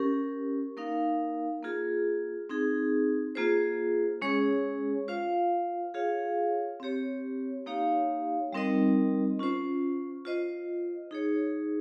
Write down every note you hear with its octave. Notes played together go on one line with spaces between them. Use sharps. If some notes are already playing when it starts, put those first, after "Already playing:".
Already playing: C#4 G4 A#4
A#3 D#4 A#4 F5
A#3 F4 G#4
C4 D#4 G#4
A#3 F4 G#4 C5
G#3 C#4 G#4 C#5
F4 C5 F5
F4 G#4 C#5 F5
C4 G4 C#5
A#3 D#4 G4 C#5 F5
G3 C4 D#4 A#4 D#5
C#4 F4 C5
F4 C5 D#5
D#4 G#4 C#5